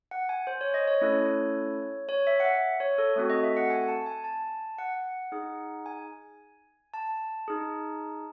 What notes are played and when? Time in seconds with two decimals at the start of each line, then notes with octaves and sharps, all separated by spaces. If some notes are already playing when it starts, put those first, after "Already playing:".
0.11 F#5
0.29 G#5
0.47 C5
0.61 C#5
0.74 D#5
0.88 C#5
1.01 A3 C#4 E4 A4
2.09 C#5
2.27 E5
2.40 F#5
2.45 E5
2.80 C#5
2.98 A4
3.16 A3 C4 F#4 A4
3.30 D#5
3.43 E5
3.57 F#5
3.70 G#5
3.88 A5
4.06 G#5
4.24 A5
4.78 F#5
5.32 D#4 G#4
5.86 G#5
6.94 A5
7.48 D#4 G#4